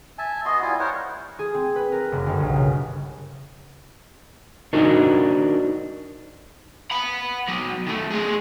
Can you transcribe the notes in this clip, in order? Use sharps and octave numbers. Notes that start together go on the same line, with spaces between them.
E5 G#5 A5
B3 F#4 D#5 C6
G3 E4 F4 G#5
A#4 C5 C#5 F#5
G#4
C4
B4
A#4
F#1
G1
B1
C#3
D4 D#4 F#4 A#4 C5 D#5
F#5 B5
F#3 B3
D#3 A3
A3 G#4